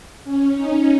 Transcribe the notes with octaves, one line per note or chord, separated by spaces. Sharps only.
C#4
D#4